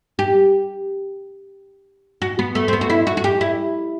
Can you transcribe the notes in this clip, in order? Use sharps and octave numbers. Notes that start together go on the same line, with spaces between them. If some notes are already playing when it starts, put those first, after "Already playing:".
G4
F#4
B3
A3
C4
B3
F#4
E4
F#4
F#4
G4
E4